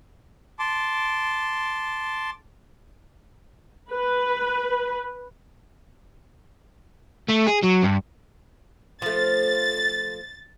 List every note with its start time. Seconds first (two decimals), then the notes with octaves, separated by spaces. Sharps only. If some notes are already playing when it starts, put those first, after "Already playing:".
0.59 A5 C6 D6
3.91 B4
7.28 A3
7.47 G#4
7.63 F#3
7.83 G2
9.02 F3 A3 A6